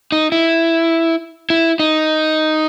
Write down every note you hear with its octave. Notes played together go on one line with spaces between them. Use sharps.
D#4
E4
E4
D#4